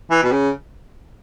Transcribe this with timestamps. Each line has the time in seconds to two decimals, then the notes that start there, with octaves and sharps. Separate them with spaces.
0.10 E3
0.23 B2
0.31 C#3